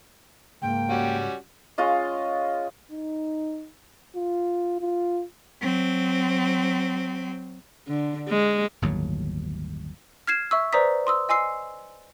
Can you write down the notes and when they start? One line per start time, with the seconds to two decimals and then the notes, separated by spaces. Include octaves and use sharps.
0.62 C#2 G#2 A#3 G5
0.90 G3 C#4 F#4
1.78 G#3 C#4 F4 D#5
2.91 D#4
4.16 F4
4.81 F4
5.62 F#3 C4
7.88 D3
8.29 G#3
8.82 G1 D#2 A2 F#3
10.27 F6 G#6 C7 E7
10.51 E5 C#6 E6
10.73 B4 C5 D5 A#5 D#6 B6
11.07 C6 D#6 E6
11.29 D#5 G#5 C6 E6 C7